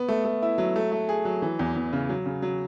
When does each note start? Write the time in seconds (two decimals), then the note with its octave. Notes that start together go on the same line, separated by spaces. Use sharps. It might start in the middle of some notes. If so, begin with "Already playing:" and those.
Already playing: B3
0.08 A3
0.25 A3
0.42 E4
0.58 F#3
0.76 A3
0.92 A3
1.09 G#4
1.25 F#3
1.42 E3
1.59 E2
1.76 E2
1.93 C#3
2.09 F#3
2.26 C#3
2.42 F#3